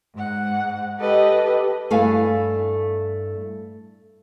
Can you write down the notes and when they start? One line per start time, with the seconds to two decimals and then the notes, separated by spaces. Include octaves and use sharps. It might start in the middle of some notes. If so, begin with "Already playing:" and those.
0.14 G#2 F#5
0.98 G4 A4 B4 D#5
1.90 G2 A3 E4 F5 G#5